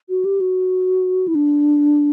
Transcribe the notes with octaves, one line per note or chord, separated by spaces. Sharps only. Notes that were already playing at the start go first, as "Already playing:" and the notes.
F#4
G4
F#4
E4
D4